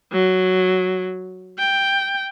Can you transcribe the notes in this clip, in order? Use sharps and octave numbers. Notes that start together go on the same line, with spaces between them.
F#3
G5